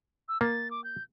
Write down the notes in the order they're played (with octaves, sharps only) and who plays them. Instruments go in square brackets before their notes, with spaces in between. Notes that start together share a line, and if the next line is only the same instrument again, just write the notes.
[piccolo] E6
[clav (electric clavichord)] A#3 [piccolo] A6
[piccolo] D6
G6